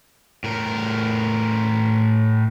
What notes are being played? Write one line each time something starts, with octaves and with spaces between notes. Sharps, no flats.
A2 A#4